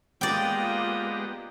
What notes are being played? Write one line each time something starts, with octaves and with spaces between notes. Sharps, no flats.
G#3 A#3 B3 F4 G4 D5 D#5 G5